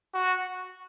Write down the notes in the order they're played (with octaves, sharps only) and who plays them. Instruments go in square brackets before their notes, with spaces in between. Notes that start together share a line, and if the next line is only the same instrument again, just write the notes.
[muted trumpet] F#4